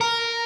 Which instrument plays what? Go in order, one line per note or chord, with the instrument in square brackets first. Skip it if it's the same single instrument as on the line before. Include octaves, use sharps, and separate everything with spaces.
[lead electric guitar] A#4